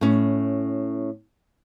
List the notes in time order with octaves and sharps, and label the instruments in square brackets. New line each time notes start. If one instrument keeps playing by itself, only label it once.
[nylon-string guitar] A2 C#4